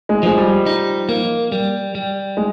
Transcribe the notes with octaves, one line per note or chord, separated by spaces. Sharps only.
G#3
F3 G#3
G3
D#4
A#3
G3
G3
G#3